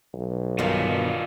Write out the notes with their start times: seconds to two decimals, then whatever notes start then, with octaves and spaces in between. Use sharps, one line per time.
0.14 B1
0.59 G2 D#3 B3 F4
0.90 B2